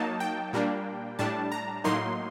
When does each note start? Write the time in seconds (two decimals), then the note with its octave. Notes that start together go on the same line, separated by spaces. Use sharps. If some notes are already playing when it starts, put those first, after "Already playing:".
Already playing: F#3 A#3 D#4 A5
0.20 G5
0.53 A#2 G3 A#3 D4
1.19 A2 G3 D4 A5
1.52 A#5
1.84 A2 F#3 A#3 D#4 C6